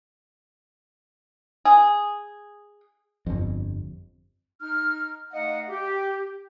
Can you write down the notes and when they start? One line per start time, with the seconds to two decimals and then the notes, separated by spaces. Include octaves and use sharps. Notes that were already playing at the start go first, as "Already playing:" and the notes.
1.65 G#4
3.26 G1 F2
4.62 D#4 F6
5.33 A3 D#4 D#5 F5 F#5
5.69 G4